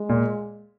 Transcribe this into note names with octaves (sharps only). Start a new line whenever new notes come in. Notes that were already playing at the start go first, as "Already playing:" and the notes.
Already playing: G#3
A#2